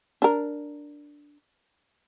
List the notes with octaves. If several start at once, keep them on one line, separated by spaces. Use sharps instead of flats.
D4 A#4